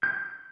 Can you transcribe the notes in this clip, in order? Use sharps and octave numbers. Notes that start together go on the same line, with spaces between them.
G6